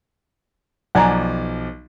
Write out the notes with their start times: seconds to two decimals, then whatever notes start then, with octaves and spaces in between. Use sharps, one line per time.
0.95 B1 F3 D5 F#5 G#5 A#5